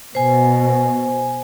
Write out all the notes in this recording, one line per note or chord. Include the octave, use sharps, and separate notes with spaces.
B2 C5 G#5